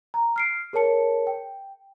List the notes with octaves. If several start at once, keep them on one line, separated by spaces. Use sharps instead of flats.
A#5
F6 C7 D7
G#4 A#4 C#5 A5 C#7
G5